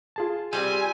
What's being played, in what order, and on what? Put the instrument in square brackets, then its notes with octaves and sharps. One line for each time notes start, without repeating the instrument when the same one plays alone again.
[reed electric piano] F4 G#4 A5
[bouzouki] G3 A3 C4 [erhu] G#5